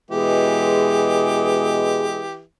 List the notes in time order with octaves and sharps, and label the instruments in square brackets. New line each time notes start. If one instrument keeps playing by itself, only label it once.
[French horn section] B2 G#3 [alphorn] E3 [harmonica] G4 [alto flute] G#4